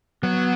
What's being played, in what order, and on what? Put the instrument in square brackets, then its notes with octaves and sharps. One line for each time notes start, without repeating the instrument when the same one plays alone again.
[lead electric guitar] F#3 [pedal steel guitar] B3